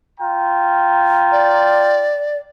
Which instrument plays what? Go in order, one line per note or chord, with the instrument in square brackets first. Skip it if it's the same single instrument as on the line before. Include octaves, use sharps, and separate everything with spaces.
[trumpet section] F4 G5 A#5
[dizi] D5